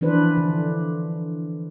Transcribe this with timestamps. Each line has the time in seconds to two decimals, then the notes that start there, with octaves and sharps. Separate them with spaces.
0.01 E3 F3 D4 B4 C5
0.37 D3